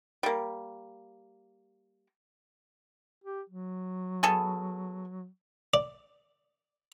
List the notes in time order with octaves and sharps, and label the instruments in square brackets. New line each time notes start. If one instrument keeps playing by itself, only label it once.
[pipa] G3 A#3
[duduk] G4
F#3
[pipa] B3 G#4 A4
[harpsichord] D5